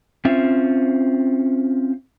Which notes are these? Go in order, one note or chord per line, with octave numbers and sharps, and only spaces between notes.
C4 C#4 F4 C5 E5